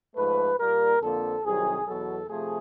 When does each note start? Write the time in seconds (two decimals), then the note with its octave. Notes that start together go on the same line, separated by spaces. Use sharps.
0.16 G#2 F3 A3 B4
0.59 A#2 G3 A#3 A#4
1.01 F2 D3 F3 A#3 A4
1.44 C2 C3 D#3 F#3 G#4
1.86 E2 B2 F#3 A4
2.30 C3 F3 A3 G#4